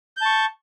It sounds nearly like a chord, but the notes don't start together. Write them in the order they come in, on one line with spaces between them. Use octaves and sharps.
G6 A5 C#6